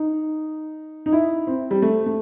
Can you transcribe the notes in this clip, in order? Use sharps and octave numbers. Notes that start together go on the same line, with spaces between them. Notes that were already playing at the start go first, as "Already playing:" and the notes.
Already playing: D#4
D#4
E4
C4
G3
A3
A3